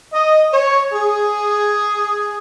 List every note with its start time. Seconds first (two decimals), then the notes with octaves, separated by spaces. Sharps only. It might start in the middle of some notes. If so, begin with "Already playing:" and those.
0.12 D#5
0.53 C#5
0.93 G#4